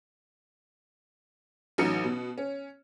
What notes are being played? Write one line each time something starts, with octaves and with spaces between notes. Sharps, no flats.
A1 F#3 D#4 C#7
B2
C#4